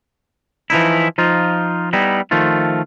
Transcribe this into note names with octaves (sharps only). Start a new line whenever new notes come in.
E3 F3 D#4 E4
F3 D#4 F4
G3 B3 D#4 E4
D#3 F3 A3 F4